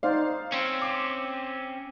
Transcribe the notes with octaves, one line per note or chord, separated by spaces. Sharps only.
D#4 C5 D5 F5
C4 C#4
D6